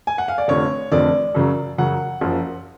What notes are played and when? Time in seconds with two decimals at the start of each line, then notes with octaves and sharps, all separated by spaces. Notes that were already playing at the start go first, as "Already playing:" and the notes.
0.07 G#5
0.18 F#5
0.28 F5
0.38 D5
0.48 F1 F2 D3 C#5
0.91 F1 F2 D3 D5
1.35 F#2 C#3 F#3
1.78 F#2 C#3 F#3 F#5
2.21 F#1 F#2 F3